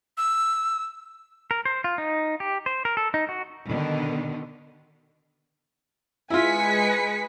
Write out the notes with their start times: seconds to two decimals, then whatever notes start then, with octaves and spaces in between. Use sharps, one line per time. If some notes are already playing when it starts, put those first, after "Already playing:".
0.17 E6
1.51 A#4
1.66 C5
1.84 F4
1.98 D#4
2.40 G4
2.66 C5
2.85 A#4
2.97 A4
3.14 D#4
3.29 F#4
3.66 B2 D3 D#3
6.30 G#3 E4 F4 B4 G#5 B6 C#7